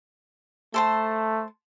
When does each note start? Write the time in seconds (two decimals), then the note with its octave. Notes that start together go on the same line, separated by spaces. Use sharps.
0.74 A3 A4 C5 A5